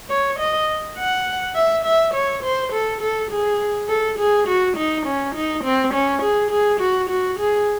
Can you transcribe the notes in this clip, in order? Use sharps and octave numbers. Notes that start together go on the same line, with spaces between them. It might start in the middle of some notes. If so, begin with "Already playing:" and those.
C#5
D#5
F#5
E5
E5
C#5
C5
A4
A4
G#4
A4
G#4
F#4
D#4
C#4
D#4
C4
C#4
G#4
G#4
F#4
F#4
G#4